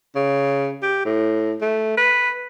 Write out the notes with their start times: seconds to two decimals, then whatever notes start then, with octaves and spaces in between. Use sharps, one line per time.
0.15 C#3
0.82 G4
1.06 A2
1.61 A3
1.97 B4